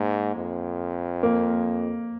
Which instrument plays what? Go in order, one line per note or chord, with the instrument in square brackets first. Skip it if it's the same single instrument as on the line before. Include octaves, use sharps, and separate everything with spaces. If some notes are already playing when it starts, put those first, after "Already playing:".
Already playing: [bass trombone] G#2 [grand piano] A#3
[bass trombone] F2
[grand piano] A#3